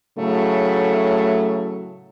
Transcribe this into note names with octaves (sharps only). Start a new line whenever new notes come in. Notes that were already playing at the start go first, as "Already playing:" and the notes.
A2 C#3 F#3 A3